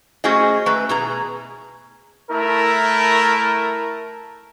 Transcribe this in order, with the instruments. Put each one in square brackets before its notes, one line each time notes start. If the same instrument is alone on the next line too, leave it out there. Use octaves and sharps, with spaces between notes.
[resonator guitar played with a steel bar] A3 C#4 F#4 G#4 C5 D#5
A3 B4 E5 A#5
B2 G#4 A#5
[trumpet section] A3 E4 A#4